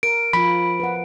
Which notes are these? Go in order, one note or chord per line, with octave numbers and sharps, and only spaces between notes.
A#4 D7
F3 F4 B5
B4 F#5